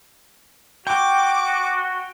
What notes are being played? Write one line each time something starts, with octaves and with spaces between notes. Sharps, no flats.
F#4 G5 D6